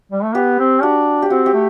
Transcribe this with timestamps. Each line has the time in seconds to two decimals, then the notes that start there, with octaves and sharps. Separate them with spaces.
0.12 G3
0.24 A3
0.34 B3 G4
0.59 C4
0.83 D4 F#4
1.22 G4
1.30 C4 F#4
1.46 G4
1.54 A3